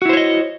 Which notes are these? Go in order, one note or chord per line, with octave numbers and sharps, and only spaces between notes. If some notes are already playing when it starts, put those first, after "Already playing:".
E4 F#4 C5 C#5 D#5